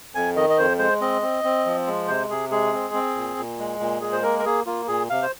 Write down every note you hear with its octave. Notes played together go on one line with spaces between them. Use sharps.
F2 G#5
D#3 D#5
D#5
F2 C5
G#3 C5
C4 D#5
C4
C4
F3
G#3
C3 C5
C3 G#4
G#3 G#4
C4
C4
A#2
A#2
G#3
A#2
G#3 G#4
C5
A#3 A#4
A#4
A#3 G#4
A#3 F4
A#2 G#4
C3 F5
C5